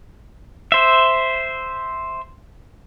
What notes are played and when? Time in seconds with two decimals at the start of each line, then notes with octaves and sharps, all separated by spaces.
0.72 C5 E5